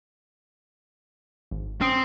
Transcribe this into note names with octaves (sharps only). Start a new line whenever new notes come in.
G#1
C4 C#4 D#6 D7